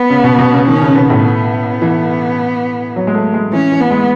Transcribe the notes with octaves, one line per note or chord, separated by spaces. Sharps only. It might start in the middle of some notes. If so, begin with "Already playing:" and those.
Already playing: B3
C#3
B2
B2
C#3
D#3 C#4
C#3
B2 B3
A2
B3
E3
F#3
G#3
A3
G#3
E3 C#4
E3
B3
G#3